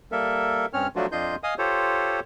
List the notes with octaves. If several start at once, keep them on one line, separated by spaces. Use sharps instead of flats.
G3 A#3 A4 A#4 E5
G2 C4 C#4 C#5 F6
F3 F#3 A3 D4 F4 F#4
F2 D4 F4 D#5 C6 G6
D#5 F5 G#5 D#6
F4 G4 A4 C5 C#5